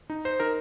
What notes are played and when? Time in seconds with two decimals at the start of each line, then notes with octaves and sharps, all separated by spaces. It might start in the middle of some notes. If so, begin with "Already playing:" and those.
0.10 D#4
0.25 C5
0.40 D#4 A#4